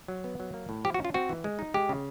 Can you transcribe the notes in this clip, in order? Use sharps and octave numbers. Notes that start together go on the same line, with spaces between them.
F#3
B3
F#3
A#3
A2
F3 G4
F#4
C#4
F4
C4 F#4
E3
G#3
D#4
G#3 G4
C#3